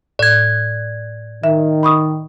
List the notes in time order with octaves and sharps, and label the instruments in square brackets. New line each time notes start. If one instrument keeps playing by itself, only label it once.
[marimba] A2 [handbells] D5 G#6
[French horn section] D#3 [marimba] E5
[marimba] B5 C#6 D#6